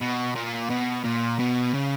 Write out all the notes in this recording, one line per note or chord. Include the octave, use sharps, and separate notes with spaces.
B2
A#2
B2
A#2
B2
C#3